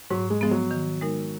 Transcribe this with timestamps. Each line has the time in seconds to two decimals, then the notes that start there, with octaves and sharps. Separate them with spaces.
0.10 G#2 F#3
0.30 G#3
0.41 F3 G#3 B3
0.51 F#3
0.71 D#3
1.01 G#3 D#4 A#4